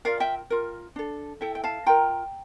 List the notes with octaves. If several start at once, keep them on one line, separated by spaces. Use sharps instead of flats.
F4 A#4 D5 F5
E5 G5
F4 A#4
D4 A4
E4 A4 E5 G5
G5
F5 A5
F4 A#4 G5 A#5